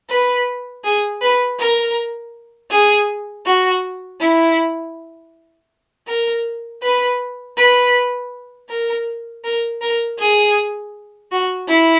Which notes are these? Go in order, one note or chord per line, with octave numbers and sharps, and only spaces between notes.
B4
G#4
B4
A#4
G#4
F#4
E4
A#4
B4
B4
A#4
A#4
A#4
G#4
F#4
E4